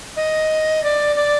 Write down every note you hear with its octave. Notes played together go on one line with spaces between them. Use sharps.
D#5
D5
D5